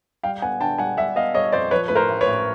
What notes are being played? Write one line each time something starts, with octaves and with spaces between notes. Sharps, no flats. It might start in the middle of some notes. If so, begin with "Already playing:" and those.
G3 F5 G5
B3 F#5 G#5
D3 G5 A5
G3 F#5 G#5
G3 E5 F#5
B3 D#5 F5
G3 C#5 D#5
F2 C5 D5
F3 B4 C#5
A2 B4
A#4 C5
A1
B4 C#5
A1